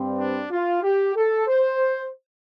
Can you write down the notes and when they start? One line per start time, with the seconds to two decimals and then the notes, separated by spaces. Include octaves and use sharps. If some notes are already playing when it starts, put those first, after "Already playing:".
Already playing: G2 G3 C4
0.18 D4
0.51 F4
0.83 G4
1.16 A4
1.48 C5